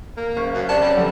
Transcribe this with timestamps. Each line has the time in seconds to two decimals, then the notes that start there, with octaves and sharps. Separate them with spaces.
0.17 A#3
0.37 F#1 F5 C#6
0.54 F#2
0.69 C3 D5 A5
0.82 F#2 F#3 G3
0.97 F2 D3 B3